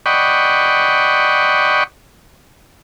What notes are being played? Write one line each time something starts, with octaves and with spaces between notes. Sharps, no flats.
D5 D#5 F#5 G5 B5 C#6